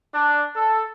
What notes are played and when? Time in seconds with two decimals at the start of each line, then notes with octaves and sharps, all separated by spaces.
0.14 D4
0.56 A4